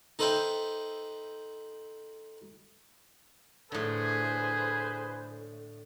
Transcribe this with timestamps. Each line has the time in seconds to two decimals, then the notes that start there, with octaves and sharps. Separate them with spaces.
0.19 D#4 A4 B4 C5 E5 G5
3.72 A2 D3 G#4 B4 C5 G#5